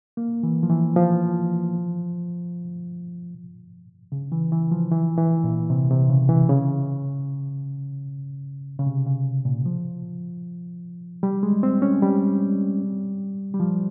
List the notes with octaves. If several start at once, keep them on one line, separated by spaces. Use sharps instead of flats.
A#3
E3
F3
E3
F3
C#3
E3
E3
F3
E3
E3
A#2
C3
C3
C#3
E3
C#3
C#3
C3
C#3
A#2
F3
G3
G#3
C4
C#4
G3
G3
F3